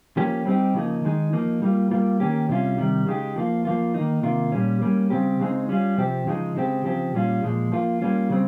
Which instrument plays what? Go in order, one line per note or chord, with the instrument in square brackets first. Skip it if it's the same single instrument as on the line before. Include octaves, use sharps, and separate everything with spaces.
[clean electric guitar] F3 A#3 C#4 G4
G3 C4 D#4 G4
C#3 F3 A#3 D#4
D#3 G#3 D#4
F3 A#3 D#4
G3 A#3 F4
G3 A#3 F4
D#3 A#3 C#4 G4
C3 G3 C#4 F4
C3 D#3 G3
C#3 G#3 D#4 G4
F3 A#3 F4
F3 A#3 F4
D#3 A#3 D#4
C3 D#3 A#3 F4
A#2 G3 C#4
G3 A#3 C#4
C#3 G3 C4 G4
C#3 G#3 C4 D#4
G3 C#4 F4
C3 F3 C4 G4
C#3 F3 G#3 D#4
C#3 G#3 C4 G4
C#3 F3 C4 G4
A#2 G3 C#4 F4
A#2 F3 G#3
F3 A#3 F4
G3 A#3 C#4 F4
C#3 G3 C4